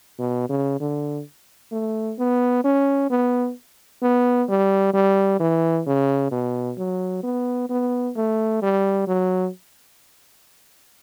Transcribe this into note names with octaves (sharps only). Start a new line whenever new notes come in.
B2
C#3
D3
A3
B3
C#4
B3
B3
G3
G3
E3
C#3
B2
F#3
B3
B3
A3
G3
F#3